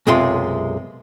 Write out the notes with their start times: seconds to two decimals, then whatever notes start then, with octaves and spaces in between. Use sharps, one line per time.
0.07 B1 F#2 C3 G#3 F4 C6